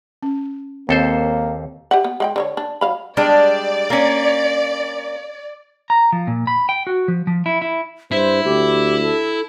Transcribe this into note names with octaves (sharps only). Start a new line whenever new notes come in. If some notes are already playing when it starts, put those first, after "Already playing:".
C#4
D#2 A#3 C4 A4 C5
G4 E5 F#5
B3
G#3 F#5 G5
D3 E4 C#5
D4
F#3 F5 B5
G3 G#3 D4 D5
A#3 C#4
A#5
F3
A#2
B5
G5
F#4
F3
F3
E4
E4
G2 E4 C5
D2 G4
A4